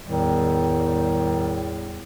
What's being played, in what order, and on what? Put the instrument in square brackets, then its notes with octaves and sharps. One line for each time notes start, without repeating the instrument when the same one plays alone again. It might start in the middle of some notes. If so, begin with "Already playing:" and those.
[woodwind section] E2 A2 G3 [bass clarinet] D#3